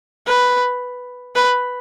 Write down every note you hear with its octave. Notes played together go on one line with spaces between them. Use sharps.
B4
B4